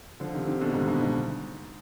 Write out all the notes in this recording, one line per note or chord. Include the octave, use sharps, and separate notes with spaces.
D3 F3
C3 D#3
C3 D#3
B2 D3
G#2 C3
G2 B2
G#2